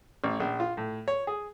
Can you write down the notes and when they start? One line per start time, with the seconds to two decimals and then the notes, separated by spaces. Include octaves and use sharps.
0.24 A1
0.40 A#1
0.60 F4
0.77 A2
1.08 C#5
1.27 G#4